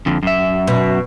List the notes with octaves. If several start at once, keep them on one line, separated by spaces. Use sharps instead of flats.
F2 D3
F#2 E5
B2